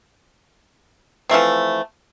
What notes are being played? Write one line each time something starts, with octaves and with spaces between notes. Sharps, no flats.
E3 F3 A3 C4